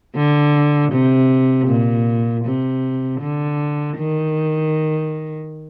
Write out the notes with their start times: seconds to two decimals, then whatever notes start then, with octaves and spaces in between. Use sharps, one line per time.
0.16 D3
0.92 C3
1.67 A#2
2.45 C3
3.21 D3
3.97 D#3